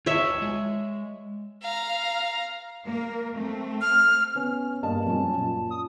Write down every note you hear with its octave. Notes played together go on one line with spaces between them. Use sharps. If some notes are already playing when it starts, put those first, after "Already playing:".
F4 C#5 D#5 E5
G#3
F5 A#5
A#3 A#4
A3 C4
F6
B3 C#4
G2 A#3 D#5 A5
F#2 F3 C#4
A#2
D#6